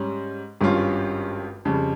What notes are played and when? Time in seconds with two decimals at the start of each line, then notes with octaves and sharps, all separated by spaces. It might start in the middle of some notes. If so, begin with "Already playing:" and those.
Already playing: G#2 G3 C#4
0.61 G#1 G2 G3 C#4 F4
1.65 F2 C#3 G3